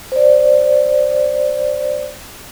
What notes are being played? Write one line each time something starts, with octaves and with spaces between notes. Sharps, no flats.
C5 D5